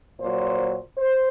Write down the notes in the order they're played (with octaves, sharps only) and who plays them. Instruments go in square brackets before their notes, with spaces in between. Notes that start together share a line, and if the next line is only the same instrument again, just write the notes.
[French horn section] A#2 F#3 C5
C5